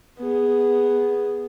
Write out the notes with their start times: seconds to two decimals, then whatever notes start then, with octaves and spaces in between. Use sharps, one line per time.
0.18 B3 G#4